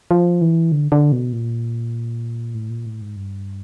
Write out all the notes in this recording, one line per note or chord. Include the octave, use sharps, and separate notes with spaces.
F3
E3
D3
D3
B2
A#2
A2
A#2
A2
G#2
G2